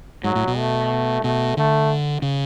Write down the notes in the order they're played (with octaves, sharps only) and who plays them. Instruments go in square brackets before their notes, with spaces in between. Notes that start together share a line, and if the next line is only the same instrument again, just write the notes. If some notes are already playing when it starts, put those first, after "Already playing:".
[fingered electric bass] G#2 [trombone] F#3
[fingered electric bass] A2
B2
[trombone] A3
[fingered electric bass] B2 [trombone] A3
[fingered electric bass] D3 [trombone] A3
[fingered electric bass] C#3